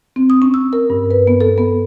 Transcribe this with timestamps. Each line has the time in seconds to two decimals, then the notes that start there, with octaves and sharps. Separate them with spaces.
0.16 C4
0.30 D#6
0.42 C#4
0.54 E6
0.73 A#4
0.90 G2
1.11 B4
1.27 B3
1.41 A4
1.58 B3